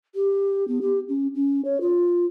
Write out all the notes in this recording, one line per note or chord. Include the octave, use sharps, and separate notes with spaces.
G4
B3
G4
C#4
C#4
C#5
F4